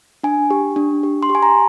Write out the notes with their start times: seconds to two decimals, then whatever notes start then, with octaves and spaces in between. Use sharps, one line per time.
0.24 D4 G#5
0.50 G4
0.76 D4
1.03 G4
1.23 C6
1.29 G4
1.35 G#5
1.42 A#5